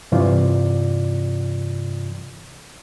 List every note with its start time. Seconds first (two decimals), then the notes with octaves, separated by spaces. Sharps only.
0.12 G2 C3 E3 F4 D5